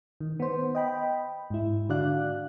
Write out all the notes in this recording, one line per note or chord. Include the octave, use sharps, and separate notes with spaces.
D#3
B3 C5
D#5 G5 B5
G#2 E4
D3 D4 F#4 D5 F5 F#6